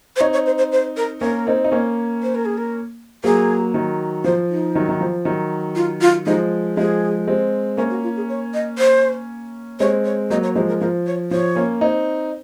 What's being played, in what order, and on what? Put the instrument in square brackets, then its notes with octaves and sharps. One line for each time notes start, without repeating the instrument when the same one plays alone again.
[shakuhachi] C5
[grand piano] C4 D#4 [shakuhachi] C#5
[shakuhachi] C#5
C5
C5
C5
A#4
[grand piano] A#3 C#4 [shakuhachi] A#4
[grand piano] C4 D#4
D#4
A#3 C#4
[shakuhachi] C5
A#4
G#4
A#4
[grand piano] F#3 A#3 [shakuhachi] G#4
[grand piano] D#3 F#3
[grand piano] F3 [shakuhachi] C5
[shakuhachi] D#4
[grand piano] D#3 F#3
D#3
F3
D#3 F#3
[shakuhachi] F4
F4
[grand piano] F3 G#3 [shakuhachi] D#4
[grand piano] F3 G#3 [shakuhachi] G#4
[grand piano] G#3 C4
[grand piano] A#3 C#4 [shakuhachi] A#4
[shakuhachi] F#4
F4
G#4
C#5
D#5
C5
[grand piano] G#3 C4 [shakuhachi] C#5
[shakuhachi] C#5
[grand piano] F#3 A#3 [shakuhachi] D#5
[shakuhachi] C#5
[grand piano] F3 G#3 [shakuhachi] C5
[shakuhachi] A#4
[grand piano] F3 [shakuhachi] A#4
[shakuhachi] C#5
[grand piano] F3 [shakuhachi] C#5
[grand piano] A#3 C#4
C4 D#4